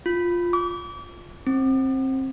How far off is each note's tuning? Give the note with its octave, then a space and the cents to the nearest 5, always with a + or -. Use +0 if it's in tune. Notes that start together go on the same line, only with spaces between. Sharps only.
F4 +5
D6 -35
C4 +20